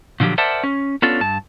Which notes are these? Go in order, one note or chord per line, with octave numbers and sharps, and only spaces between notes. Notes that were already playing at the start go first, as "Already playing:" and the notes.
A#2 D3 F3 F#3 G4
A#4 C5 D5 E5 F#5 A5
C#4
B3 C#4 D4 F4 A4 C#5
G2 A5